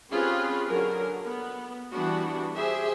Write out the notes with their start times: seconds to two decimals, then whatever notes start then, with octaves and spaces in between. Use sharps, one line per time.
0.11 C4 C#4 F4 G4 G#4 B4
0.69 D3 F#3 G#4 A#4
1.25 B3
1.91 E3 G3 B3 D4 F#4
2.56 G4 G#4 C5 E5